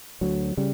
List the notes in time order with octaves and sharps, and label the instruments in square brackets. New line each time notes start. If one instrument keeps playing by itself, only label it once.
[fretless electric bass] D2 F#3
C#3 G3